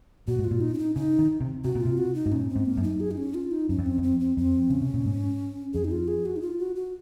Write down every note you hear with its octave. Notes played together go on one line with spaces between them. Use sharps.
A#2 F#4
G#2
F4
A#2
D#4
C#4
D#4
C#3 D#4
D#3
C3
C3 F#4
A#2
F4
C3
F#4
D#4
G#2
A#2 C#4
C4
G#2
A#3
F#2
D#4
G#4
D#4
C#4
F4
D#4
F#2 C#4
F2
C4
F2
C4
C4
F2 C4
C#3 C#4
C3
A#2
G#2
F2 G#4
D#4
F4
G#4
F#4
D#4
F4
F#4
F#4